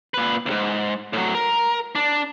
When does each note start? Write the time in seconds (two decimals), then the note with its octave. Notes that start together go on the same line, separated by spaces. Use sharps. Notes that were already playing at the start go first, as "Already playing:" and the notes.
0.14 A#2 B4
0.46 C2 G#2
1.13 A2 F#3
1.35 A#4
1.95 D4